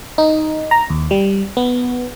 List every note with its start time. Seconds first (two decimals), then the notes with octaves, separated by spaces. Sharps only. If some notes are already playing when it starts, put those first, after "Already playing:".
0.18 D#4
0.71 A#5
0.90 D#2
1.11 G3
1.57 B3